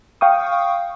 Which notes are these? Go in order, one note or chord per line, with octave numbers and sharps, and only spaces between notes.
F5 G5 C#6 D#6